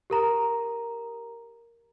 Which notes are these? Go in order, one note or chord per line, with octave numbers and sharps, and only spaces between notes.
G4 A#4 A#5